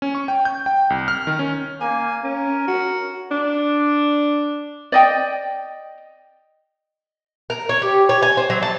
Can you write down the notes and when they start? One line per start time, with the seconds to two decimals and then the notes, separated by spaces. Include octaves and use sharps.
0.02 C#4
0.15 C#6
0.28 G5
0.45 G6
0.66 G5
0.90 C2
1.08 F6
1.27 D#3
1.39 C#4
1.81 A#3 G#5
2.24 C#4 A#4
2.68 F#4
3.31 D4
4.92 D5 D#5 G5
7.50 A#4
7.69 C#5
7.82 G4
8.09 C#5
8.22 G#5
8.37 C5
8.50 F#3
8.62 A5